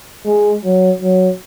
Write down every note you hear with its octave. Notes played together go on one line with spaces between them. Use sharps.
G#3
F#3
F#3